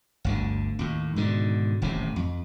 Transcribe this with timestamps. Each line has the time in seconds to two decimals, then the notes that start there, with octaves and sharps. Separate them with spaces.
0.24 G1 D2 D3
0.79 D#2 A2
1.16 G#2 B2 D3 D#3
1.82 D#1 A1 A2 C3
2.16 F2